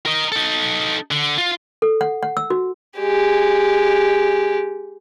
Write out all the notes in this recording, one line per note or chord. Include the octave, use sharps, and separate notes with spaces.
A#4 D#5
D#4 A4
D3
F4
A4
F#5
F#5
E6
F#4
G#3 G4